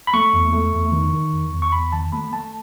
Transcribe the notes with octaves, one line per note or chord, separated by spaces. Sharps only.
B5
A3 C#6
E2
A3
E2
D#3
D#3
E2
E2
C#6
E2 B5
D#3 A5
A3 B5
A3 A5